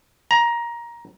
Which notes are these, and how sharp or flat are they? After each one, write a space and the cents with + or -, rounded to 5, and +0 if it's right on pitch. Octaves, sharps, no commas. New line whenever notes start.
A#5 +15